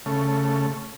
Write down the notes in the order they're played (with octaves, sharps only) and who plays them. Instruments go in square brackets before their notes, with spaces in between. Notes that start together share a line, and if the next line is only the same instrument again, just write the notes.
[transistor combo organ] C#3 A3